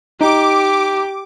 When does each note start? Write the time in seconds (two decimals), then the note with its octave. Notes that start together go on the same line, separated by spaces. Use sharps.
0.21 D#4 G4 D6